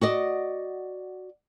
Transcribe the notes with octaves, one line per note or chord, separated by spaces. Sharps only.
F#4 D5 D#5